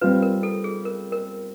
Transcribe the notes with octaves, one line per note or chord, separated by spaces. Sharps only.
G3 C4 F4 B4
A#4
A4
G#4
A#4
A#4